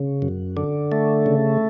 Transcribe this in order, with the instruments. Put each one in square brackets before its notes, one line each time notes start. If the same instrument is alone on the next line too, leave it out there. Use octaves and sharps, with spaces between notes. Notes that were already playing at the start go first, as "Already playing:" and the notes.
Already playing: [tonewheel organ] C#3
F#2
D3
A3
C#3